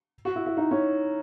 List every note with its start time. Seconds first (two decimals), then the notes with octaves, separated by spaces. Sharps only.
0.25 F#4
0.36 E4
0.46 E4
0.57 D#4
0.71 C#4